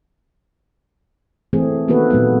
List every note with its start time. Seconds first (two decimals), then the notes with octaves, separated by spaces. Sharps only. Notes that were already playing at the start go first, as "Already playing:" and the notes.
1.53 E3 A3 C4 G#4
1.88 D#3 A#3 B3 F#4 A4 B4
2.10 A#2 F#3 G#3 B3